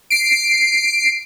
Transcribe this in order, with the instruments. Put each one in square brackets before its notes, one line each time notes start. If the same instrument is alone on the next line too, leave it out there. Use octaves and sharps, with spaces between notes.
[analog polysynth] C7 D7